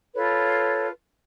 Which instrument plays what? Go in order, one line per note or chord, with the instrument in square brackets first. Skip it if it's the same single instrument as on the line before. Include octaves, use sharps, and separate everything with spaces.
[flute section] F4 A4 B4 C#5